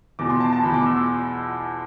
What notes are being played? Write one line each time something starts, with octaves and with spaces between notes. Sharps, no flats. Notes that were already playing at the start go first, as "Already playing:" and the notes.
E2 B2 D6
C6
A5
A5
E2 B2 B5
D6
E6
D6